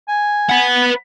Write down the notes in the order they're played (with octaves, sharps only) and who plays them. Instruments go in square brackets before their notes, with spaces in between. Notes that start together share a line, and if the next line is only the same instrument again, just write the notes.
[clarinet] G#5
[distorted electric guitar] B4 F#5